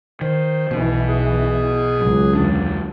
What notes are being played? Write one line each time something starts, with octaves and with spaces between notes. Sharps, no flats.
D#3 C5
B1 B2 E3
G#4
C#2 F#3
E2 D3 D4